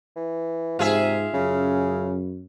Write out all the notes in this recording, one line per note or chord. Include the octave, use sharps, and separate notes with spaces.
E3
G#2 C3 F4 G#4 E5
F#2 C#3